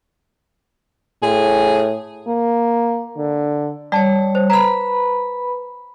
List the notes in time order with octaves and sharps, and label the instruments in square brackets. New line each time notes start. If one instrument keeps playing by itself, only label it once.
[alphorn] A2 [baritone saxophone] G#4
[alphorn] A#3
D3
[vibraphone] G3 C#5 [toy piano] D5 A5
[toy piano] C5
[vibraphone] B4 B5 [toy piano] A#5